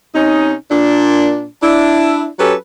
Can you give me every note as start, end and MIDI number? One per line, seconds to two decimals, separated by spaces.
0.14 0.52 48
0.14 0.52 61
0.14 0.52 63
0.70 1.45 46
0.70 1.45 62
1.62 2.27 62
1.62 2.27 64
2.38 2.54 54
2.38 2.54 61
2.38 2.54 67
2.38 2.54 69
2.38 2.54 71